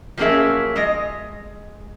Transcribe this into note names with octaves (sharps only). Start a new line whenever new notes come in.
F3 F#3 A#3 C#4 G#4 E5
G#3 D#5